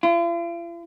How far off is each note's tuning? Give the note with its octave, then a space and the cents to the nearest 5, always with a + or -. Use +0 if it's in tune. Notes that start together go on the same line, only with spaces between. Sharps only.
F4 -45